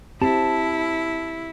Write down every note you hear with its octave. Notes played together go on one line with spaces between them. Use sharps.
C4 E4 G4 A5